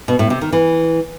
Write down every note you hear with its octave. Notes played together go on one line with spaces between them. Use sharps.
B2
A2
C3
D#3
E3